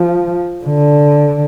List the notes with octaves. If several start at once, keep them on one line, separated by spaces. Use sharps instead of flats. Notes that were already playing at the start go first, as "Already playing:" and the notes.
Already playing: F3
D3